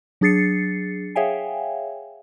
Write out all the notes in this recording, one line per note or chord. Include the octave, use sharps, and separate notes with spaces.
F#3 D4 G#4 A6 C7 C#7
G#4 C#5 E5 F5 G5 G#5